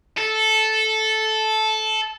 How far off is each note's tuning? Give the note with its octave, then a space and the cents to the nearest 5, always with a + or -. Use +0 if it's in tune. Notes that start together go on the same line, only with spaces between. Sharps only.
A4 -10